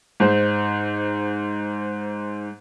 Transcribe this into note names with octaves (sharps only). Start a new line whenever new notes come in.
G#2 C5